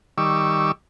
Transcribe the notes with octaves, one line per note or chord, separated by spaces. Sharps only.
D#3 G3 C#6 D6 E6